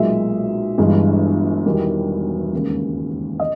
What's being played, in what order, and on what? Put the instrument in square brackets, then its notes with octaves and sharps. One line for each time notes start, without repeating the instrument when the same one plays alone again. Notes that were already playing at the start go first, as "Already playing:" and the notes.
Already playing: [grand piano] B1 A#2 G#3 E5
G1 G2 E3 G#3
E1 E2 D#3 G3
D#2 C#3 G#3
D#5